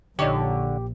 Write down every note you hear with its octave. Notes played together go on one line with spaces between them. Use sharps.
A#1 D3 D4 D#4 G4 C#5